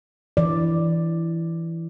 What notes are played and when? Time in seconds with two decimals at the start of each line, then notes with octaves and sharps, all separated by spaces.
0.37 E3 D5